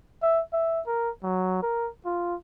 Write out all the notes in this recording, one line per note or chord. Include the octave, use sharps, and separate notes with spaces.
E5
E5
A#4
F#3
A#4
F4